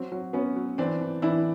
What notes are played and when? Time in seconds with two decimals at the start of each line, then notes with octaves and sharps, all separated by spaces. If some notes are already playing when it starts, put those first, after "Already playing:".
Already playing: F#3 C4
0.12 F#3
0.33 F#3 B3 C#4
0.56 F#3
0.78 E3 C4 D4
1.01 E3
1.22 E3 D4 E4